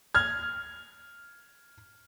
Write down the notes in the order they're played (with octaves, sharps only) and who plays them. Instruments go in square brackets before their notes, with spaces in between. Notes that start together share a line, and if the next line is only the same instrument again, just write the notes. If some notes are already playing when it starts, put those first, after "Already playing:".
[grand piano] F6 G#6